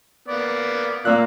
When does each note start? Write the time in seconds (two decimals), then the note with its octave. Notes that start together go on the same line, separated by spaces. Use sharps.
0.28 A#3 B3 D5
1.05 A#2 A#3 E6 F#6